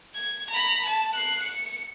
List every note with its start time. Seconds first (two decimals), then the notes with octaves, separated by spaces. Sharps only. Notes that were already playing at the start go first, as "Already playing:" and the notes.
0.14 G#6
0.50 A#5 B5
0.85 A5
1.13 F#6 C7
1.42 C#7